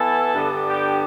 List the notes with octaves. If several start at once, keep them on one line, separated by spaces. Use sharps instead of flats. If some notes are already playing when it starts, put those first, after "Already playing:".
Already playing: E3 B3 E4 A4 A5
G2 D3 G3 B3 D4
G4 G5